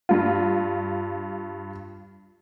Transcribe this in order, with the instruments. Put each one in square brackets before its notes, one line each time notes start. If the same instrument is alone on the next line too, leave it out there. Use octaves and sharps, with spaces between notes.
[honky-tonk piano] G2 F4